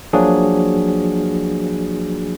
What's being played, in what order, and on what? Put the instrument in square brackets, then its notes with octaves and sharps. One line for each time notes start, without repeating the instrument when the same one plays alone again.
[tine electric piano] F3 F#3 A#3 D4 F#4 G#4